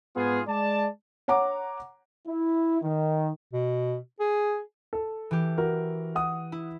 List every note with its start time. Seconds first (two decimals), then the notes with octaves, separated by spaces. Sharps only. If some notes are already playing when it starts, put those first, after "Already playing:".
0.16 G#2 B3 F4 G#4
0.47 G#3 D5 A5
1.28 C#5 F#5 A#5 D6
2.27 E4
2.82 D#3
3.53 B2
4.20 G#4
4.93 A4
5.31 E3 G4
5.58 F#4 A#4
6.15 F#5 D#6
6.52 E4